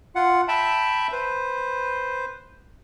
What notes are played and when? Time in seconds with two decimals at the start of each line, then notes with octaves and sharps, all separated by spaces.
0.15 F4 F#5
0.48 E5 G5 A5 B5
1.12 B4 C5